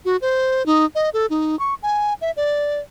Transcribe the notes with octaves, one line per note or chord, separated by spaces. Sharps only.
F#4
C5
D#4
D#5
A4
D#4
C#6
G#5
E5
D5